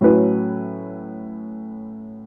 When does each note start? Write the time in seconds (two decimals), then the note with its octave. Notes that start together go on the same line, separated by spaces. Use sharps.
0.01 A2 F#3 C#4 E4 B4